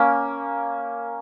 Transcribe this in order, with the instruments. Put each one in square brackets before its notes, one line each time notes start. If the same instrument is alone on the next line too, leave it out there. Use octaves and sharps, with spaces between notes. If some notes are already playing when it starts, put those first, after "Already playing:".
Already playing: [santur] A#3 C#4